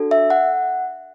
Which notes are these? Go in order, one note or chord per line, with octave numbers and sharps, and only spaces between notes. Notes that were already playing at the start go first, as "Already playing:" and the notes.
Already playing: D4 F#4 A4
E5
F#5